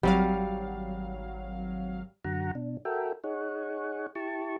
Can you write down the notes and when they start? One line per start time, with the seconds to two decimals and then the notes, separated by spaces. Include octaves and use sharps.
0.03 G#1 F#3 G3 F5
2.24 F#2 D3 F#4 F#5 A#5
2.55 B2 D4
2.85 F#4 A4 A#4 E5 G5
3.24 D#4 G#4 C#5 F#5
4.15 E4 G4 A5 C#6